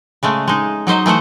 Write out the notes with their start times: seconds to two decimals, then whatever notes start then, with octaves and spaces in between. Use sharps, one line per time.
0.23 C#3 G#3 A3
0.48 G#3 D#4
0.87 F#3 D#4 C5 D#5
1.06 E3 A3 C5 F#5